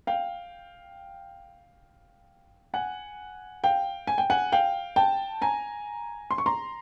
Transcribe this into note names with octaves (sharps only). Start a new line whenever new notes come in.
F5 G5
F#5 G#5
F5 G5
G#5
G5
F#5 G#5
F5 G5
G5 A5
G#5 A#5
C6
C#6
A#5 C6